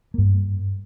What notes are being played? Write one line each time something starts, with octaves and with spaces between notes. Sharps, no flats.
G2 A#3